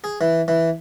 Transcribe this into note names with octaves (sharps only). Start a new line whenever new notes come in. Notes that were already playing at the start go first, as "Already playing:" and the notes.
G#4
E3
E3